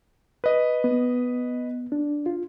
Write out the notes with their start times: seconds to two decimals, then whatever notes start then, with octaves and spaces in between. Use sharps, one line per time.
0.44 B4 D#5
0.84 B3
1.92 D4
2.26 F4